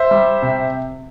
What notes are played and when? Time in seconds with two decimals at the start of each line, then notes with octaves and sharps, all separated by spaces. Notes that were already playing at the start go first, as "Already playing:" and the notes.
Already playing: C5 E5
0.11 G3
0.42 C3